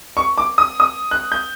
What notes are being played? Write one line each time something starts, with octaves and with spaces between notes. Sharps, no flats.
C#6
D6
D#6
D#6
F#6
G6